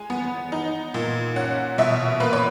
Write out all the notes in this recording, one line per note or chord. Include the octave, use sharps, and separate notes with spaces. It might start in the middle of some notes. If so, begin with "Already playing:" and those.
Already playing: G#3 G#5
B3
D#4
A#2
C#4 F#5
B2 E5
A#3 B4
C#5